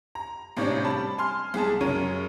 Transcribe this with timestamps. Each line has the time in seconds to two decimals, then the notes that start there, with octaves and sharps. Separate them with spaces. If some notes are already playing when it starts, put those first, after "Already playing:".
0.15 A#5
0.57 G#1 A2 C3 C#4 D4
0.84 G3 A5 B5
1.18 G#5 C6 F6
1.54 C2 G#3 G#4 A5
1.81 F#2 C#3 A#4 C#5 D#7